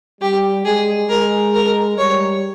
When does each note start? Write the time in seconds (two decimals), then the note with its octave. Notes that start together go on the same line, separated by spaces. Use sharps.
0.21 G3 G4
0.65 G#3 G#4
1.09 G#3 A#4
1.54 A#4
1.98 G3 C#5